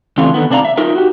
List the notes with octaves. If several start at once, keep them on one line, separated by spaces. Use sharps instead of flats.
C#3 E3 A3 C4 D4 F4
D3 D#3 B3
C3 D4 D5 F5 A#5
E5
D#4 F4 A#4 E5
F#4 G4